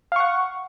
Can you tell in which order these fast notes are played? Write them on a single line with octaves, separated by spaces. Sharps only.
F5 C#6 F#5